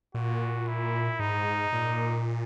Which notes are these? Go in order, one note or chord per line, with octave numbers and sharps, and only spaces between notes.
A#2 F#4
E4
G#2 D#4
A#2